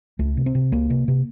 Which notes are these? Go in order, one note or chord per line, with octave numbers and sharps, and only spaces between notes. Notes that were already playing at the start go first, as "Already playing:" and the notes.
C#2 A3
C3
C4
C3
C#2 A#3
C3
C3